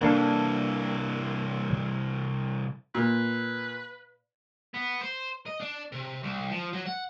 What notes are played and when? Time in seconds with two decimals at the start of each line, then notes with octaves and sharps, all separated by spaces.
0.01 C2 E3 A#3 D4 A4
2.95 A#2 B4
4.74 B3
5.01 C5
5.46 D#5
5.61 D4
5.92 C3
6.23 C2
6.51 F3
6.73 F#3
6.86 F#5